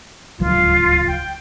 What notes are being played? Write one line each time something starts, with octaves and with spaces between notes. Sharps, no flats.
D1 C#2 F#3 F4
G5